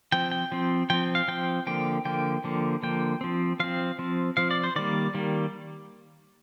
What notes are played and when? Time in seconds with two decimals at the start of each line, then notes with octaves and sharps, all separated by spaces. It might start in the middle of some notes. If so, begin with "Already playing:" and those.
0.12 F3 C4 G5
0.32 G5
0.52 F3 C4
0.90 F3 C4 G5
1.15 F5
1.28 F3 C4 G5
1.67 D3 F3 A#3 G5
2.05 D3 F3 A#3 G5
2.44 D3 F3 A#3
2.83 D3 F3 A#3 G5
3.21 F3 C4
3.60 F3 C4 F5
3.99 F3 C4
4.37 F3 C4 F5
4.51 D5
4.64 C5
4.76 D#3 G3 A#3 D5
5.14 D#3 G3 A#3